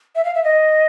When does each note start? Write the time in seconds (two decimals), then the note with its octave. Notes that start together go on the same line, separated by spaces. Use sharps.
0.16 E5
0.25 F5
0.35 E5
0.44 D#5